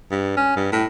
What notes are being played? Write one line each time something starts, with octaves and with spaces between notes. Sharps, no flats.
G2
C#4
G2
A2